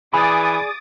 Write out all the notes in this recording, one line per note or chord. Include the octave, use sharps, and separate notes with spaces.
E3 G#4 D5 B5 D6 D#6 A6